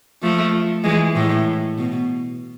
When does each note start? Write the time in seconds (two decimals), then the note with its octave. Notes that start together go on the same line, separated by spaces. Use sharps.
0.22 F3 A3
0.84 E3 G#3
1.15 A2
1.78 B2